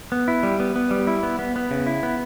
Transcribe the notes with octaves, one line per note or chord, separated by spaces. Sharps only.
B3
E4
G3
B3
B3
G3
E4
B3
B3
B3
C#3
E4
B3